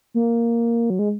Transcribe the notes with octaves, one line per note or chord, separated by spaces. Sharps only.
A#3
F#3
G#3